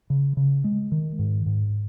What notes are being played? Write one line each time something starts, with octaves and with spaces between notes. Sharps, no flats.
C#3
C#3
G#3
D#3
G#2
G#2